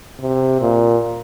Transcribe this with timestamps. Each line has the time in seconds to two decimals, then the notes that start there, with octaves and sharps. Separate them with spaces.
0.21 C3
0.61 A#2